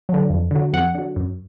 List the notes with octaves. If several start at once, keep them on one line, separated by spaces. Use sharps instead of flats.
F#3
D3
F2
D3 F#3
F2 F#5
D3 F#3
F#2